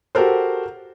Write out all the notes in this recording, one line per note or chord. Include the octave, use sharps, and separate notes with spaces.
F#4 G4 A4 A#4 C5